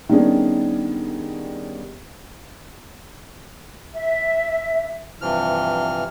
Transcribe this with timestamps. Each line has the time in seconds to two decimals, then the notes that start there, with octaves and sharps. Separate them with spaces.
0.09 D#3 G3 B3 C#4 D4 G#4
3.94 E5
5.21 G2 C3 E3 F3 F6